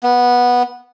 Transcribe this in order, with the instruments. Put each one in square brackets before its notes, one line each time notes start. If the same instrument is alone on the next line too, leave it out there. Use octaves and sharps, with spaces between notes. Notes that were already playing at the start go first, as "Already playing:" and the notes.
[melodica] B3